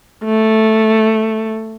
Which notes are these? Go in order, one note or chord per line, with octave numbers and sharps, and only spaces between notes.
A3